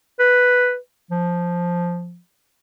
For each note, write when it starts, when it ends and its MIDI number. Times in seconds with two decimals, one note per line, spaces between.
0.19 0.76 71
1.11 2.18 53